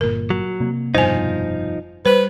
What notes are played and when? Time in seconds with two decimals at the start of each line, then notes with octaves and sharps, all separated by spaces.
0.01 G1 A#2 A#4
0.30 F#3
0.60 C3 A#3
0.95 F1 G2 B2 F3 D#4 C5 G#5
2.06 G3 B4 C5